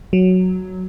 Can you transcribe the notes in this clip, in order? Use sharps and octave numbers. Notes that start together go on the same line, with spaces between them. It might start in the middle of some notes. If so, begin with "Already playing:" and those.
F#3